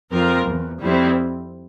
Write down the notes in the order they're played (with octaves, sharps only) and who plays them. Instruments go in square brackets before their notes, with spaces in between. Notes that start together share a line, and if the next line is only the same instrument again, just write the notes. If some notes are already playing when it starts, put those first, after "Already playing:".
[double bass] F2 [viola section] C4 F4 A#4
[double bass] E2
[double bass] F2 [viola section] G3 C4 E4